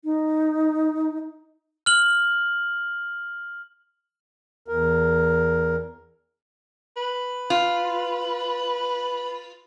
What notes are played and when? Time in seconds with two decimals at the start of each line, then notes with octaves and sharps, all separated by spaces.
0.04 D#4
1.86 F6 F#7
4.68 E2 A#4
6.97 B4
7.50 F4